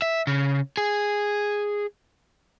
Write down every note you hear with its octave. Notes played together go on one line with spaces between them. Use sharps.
E5
C#3
G#4